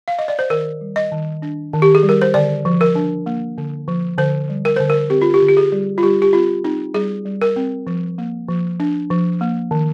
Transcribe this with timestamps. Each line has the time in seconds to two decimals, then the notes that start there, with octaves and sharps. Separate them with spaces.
0.08 F5
0.19 D#5
0.28 D5
0.39 C5
0.50 D#3 A#4
0.81 G3
0.96 D#5
1.12 D#3
1.42 D4
1.73 D#3
1.82 G4
1.95 G#4
2.03 G3
2.09 A#4
2.22 C5
2.34 D3 D5
2.65 F3
2.81 A#4
2.96 D4
3.26 A#3
3.58 D3
3.88 F3
4.18 D3 C5
4.49 G3
4.65 A#4
4.76 D3 C5
4.90 A#4
5.10 C4 G4
5.22 F4
5.34 G4
5.42 D3
5.48 G4
5.57 G#4
5.72 G3
5.98 F4
6.03 G3 G4
6.22 G4
6.33 C4 F4
6.64 C4 D#4
6.94 G3 G#4
7.25 G3
7.42 A#4
7.56 C4
7.87 F3
8.18 A#3
8.48 F3
8.80 D4
9.10 F3
9.41 A#3
9.71 D#3